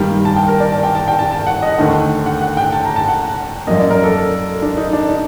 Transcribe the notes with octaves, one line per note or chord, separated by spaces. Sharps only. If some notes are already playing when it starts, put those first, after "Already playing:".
Already playing: G2 D#3 G3 A#3 G5
A5
G5
A#4
D5
A5
G5
A5
G5
A5
A5
F#5
D#5
D#2 D3 A3 F#5
F#5
F#5
G5
A5
A#5
A5
F#5
F#2 F#3 A#3 D#5
D5
A#4
A4
A4
D4
D#4
D4
D#4